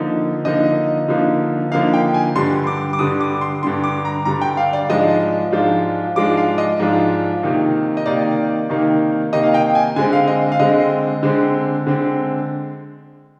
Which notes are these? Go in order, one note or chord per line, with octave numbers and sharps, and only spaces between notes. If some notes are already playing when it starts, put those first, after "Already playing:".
Already playing: D3 F3 A#3 D#4
D3 F3 A#3 D#4 D#5
D3 F3 A#3 D#4
D3 F3 A#3 D#4 F5
G5
G#5
G2 D3 G3 C6
D6
D6
G2 D3 G3 D#6
D6
C6
G2 D3 G3 C6
D6
A#5
G2 D3 G3 A#5
G5
F5
D5
G#2 F3 G#3 D4 F4 D#5
G#2 F3 G#3 D4 F4
G#2 F3 G#3 D4 F4 D6
F5
D#5
G#2 F3 G#3 D4 F4
C3 D#3 A#3 D#4
D#5
C3 D#3 A#3 D#4 D5
C3 D#3 A#3 D#4
C3 D#3 A#3 D#4 D#5
F5
G5
G#5
D3 G#3 C4 G#5
F5
D#5
F5
D3 G#3 C4 D#5
D3 G#3 C4
D3 G#3 C4